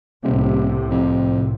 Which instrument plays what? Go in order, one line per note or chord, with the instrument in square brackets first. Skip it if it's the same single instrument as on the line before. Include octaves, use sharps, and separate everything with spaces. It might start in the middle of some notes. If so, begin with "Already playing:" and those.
[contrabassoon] D#1 [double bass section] C2 A2 C3
[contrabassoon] F2